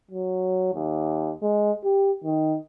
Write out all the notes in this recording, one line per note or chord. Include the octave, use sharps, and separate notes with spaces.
F#3
D#2
G#3
G4
D#3